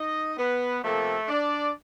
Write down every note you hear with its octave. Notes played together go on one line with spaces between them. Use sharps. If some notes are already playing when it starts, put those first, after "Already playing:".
Already playing: D#4 D#5
B3 B4
C3 F3 A3 A#3 A4
D4 D5